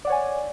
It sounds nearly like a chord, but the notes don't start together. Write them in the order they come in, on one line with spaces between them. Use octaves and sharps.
D5 F#5 C#5 G#5